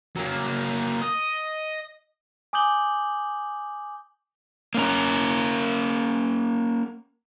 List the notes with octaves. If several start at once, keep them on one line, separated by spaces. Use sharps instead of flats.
F#3 A#3
D#5
G#5 D6 D#6 G6 F#7 G7
A#3 C#4 A#4